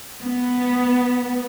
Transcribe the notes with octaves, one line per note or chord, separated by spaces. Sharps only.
B3